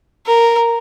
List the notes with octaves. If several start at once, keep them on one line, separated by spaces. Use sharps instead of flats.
A#4